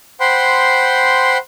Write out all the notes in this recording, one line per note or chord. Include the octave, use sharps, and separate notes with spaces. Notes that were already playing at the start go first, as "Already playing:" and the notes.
C5 F#5 G5 B5 C6